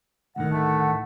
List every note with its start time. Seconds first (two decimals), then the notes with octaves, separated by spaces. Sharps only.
0.36 D2 A2 D#3 F#5
0.53 A3